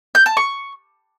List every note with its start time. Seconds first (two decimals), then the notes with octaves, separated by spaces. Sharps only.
0.15 G6
0.26 A5
0.37 C#6